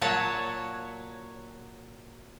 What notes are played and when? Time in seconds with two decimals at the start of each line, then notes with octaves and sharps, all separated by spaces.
0.01 A#2 F#3 C#5 F#5 A5